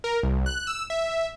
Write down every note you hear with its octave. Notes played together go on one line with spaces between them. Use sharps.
A#4
C2
F#6
E6
E5